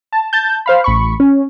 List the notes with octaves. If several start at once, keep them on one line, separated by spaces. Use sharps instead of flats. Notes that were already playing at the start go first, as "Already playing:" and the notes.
A5
A5 G6
C5 F5 B5
A1 B5 C#6
C#4